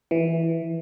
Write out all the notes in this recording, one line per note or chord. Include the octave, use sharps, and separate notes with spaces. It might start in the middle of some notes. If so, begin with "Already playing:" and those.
E3